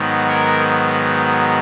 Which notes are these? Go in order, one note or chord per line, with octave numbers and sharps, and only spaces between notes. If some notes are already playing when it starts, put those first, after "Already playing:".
Already playing: G#2 D#3 F#3 B3
A#4 C#5